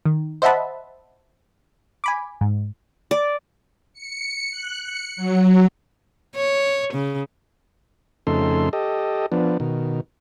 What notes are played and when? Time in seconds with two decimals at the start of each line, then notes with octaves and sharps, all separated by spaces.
0.05 D#3
0.42 C5 D#5 E5 F#5 A5 B5
2.04 G#5 B5 D6
2.41 G#2
3.11 D5
3.93 C#7
4.51 F#6
4.82 C#7
5.16 F#3
6.35 C#5
6.93 C#3
8.27 F2 C#3 A3 D#4 A4 C6
8.73 G4 A4 D#5
9.32 F3 B3 D4
9.60 B2 D#3